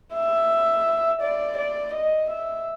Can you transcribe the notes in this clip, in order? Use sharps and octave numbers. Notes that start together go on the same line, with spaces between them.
E5
D5
D5
D#5
E5